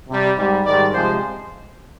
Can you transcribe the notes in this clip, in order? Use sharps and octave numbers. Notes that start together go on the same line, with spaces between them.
C3
G3
G#2 G3
G#2 D#3 G3 D5
C3 F3 G#3 C5